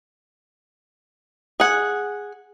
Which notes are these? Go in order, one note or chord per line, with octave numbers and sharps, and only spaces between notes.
G#4 F#5